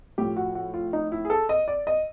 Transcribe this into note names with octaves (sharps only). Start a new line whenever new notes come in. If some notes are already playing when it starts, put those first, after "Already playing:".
A2 F3 G4
F#4
F#4
F4
D#4
E4
G#4
A4
D#5
D5
D#5